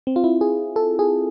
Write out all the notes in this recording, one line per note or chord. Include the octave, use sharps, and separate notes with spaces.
C4
F4
E4
G#4
A4
G#4